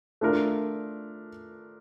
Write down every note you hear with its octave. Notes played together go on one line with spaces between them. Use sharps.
A3 D4 F4 A#4